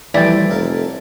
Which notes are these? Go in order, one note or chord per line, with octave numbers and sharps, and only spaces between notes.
E3 F3 G3 A3 E4 D5 G5
F1 A4 A#4 F5